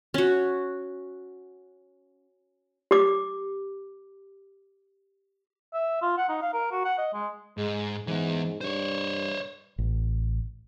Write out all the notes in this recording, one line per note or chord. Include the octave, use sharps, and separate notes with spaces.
C#4 F#4
G4 D6
E5
F4
F#5
D#4
F5
A#4
F#4
F#5
D#5
G#3
G#2 G#3
G#2 E3 B3
G2 C5 C#5
A1